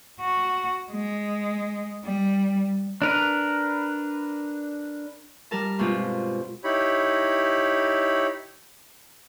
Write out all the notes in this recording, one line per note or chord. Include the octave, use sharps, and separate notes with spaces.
F#4
G#3
G3
D4 A#4 B4
G3 A#4 A5
G2 B2 G#3 C4 F4
D#4 E4 G4 C#5 B5